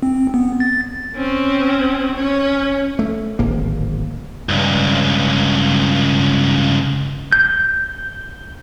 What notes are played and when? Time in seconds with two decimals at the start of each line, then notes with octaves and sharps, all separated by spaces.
0.03 C4
0.34 B3
0.60 A6
1.15 C4 C#4
2.16 C#4 C#5
2.99 A3
3.39 D1 G#1 A#3
4.49 C#2 G2
7.32 G6